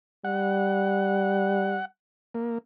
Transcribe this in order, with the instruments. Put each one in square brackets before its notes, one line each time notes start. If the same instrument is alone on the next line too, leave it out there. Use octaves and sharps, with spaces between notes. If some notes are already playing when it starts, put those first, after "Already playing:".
[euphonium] G3 [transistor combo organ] F#5
[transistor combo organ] A#3